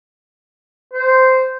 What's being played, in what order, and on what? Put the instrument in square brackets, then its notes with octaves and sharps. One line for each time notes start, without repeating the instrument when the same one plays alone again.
[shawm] C5